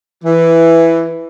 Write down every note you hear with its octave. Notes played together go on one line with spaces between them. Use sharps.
E3